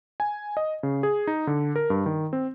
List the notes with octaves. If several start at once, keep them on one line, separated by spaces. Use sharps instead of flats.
G#5
D#5
C#3
G#4
D#4
D3
A#4
G2
D#3
C4